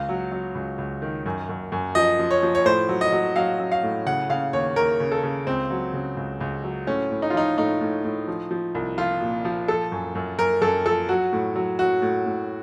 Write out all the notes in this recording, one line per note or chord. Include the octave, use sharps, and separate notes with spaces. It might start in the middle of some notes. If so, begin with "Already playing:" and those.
Already playing: C#2 F5
F#3
F#3
C#2
C#2
D#3
F#2
F#2
F#2
F3 D#5
F3
C#5
F3
C#5
A2 C5
F#3
D#5
F#3
F#3 F5
F#3
F5
A2
C#3 F#5
C#3 F5
D#2 C#5
D#2 A#4
C#3
A4
C#3
C#2 C4
F#3
C#3
C#2
C#2
F#3
A2 C#4
A2
D#4
F4
F3 D#4
A2 D#4
A2
A2
F3
F3
C2
F3 F4
A#2
F3
F3 A4
F#2
F#2
F#2 A#4
F#2 A4
F3 A4
F#3 F#4
A2
F#3
F#3 F#4
A2
A2